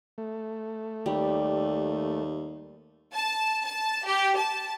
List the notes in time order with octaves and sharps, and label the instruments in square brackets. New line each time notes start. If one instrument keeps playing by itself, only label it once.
[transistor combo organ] A3
[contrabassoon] D#2 [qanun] G3
[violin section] A5
A5
G4
A5